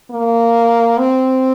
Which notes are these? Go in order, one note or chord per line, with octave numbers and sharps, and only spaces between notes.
A#3
C4